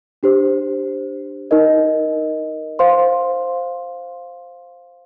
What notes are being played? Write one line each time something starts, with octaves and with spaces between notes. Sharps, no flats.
D4 G4 C5
D#4 A#4 D#5
C5 F5 C6